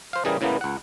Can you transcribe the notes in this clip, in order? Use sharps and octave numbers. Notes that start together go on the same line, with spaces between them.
C5 F5
C#3 E3 G3 G#4 A#4
A2 C#3 E3 A#3 B3
C#2 F#5